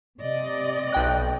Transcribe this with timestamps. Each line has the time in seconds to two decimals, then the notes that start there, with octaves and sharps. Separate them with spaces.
0.20 C3 D5 D#5
0.93 B1 G5 F#6